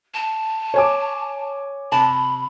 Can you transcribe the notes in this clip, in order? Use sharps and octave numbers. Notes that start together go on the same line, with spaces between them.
A5
C#5 G#5 D6
C3 A5 B5